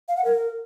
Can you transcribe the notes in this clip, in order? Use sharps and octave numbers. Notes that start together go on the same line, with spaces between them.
F5
F#5
A#4